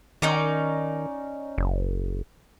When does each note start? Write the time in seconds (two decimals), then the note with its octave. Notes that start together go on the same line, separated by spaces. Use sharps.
0.22 D#3 C#4 D#4 D5
1.58 F#1